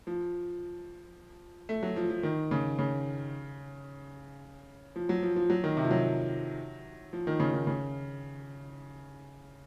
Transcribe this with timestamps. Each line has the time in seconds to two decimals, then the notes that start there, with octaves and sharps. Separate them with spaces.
0.07 F3
1.69 A3
1.83 F#3
1.96 F3
2.10 F3
2.23 D#3
2.51 C#3
2.79 C#3
4.96 F3
5.09 F#3
5.22 F3
5.36 F3
5.50 F#3
5.64 D#3
5.77 C3
5.84 F3
5.90 F#3
7.13 F3
7.27 D#3
7.40 C#3
7.53 D#3
7.67 C#3